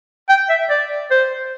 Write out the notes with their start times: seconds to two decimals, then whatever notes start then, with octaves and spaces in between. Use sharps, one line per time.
0.29 G5
0.49 E5
0.70 D5
1.11 C5